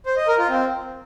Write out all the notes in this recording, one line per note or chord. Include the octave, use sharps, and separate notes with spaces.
C5
D#5
A#4
F4
C4